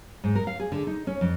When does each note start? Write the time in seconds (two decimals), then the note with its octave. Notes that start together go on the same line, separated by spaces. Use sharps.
0.24 G#2
0.35 A#4
0.47 F5
0.60 G#4
0.72 D3
0.87 D#4
1.07 C#4
1.21 F2